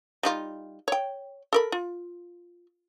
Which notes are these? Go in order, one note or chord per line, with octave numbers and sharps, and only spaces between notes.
G3 D#4 F4
C#5 G5
A4 A#4 B5
F4